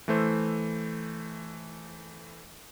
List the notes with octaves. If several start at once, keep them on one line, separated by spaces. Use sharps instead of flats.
E3 A3 C5 E6